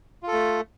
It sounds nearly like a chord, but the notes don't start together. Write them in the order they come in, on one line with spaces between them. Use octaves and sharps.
F4 A4 A3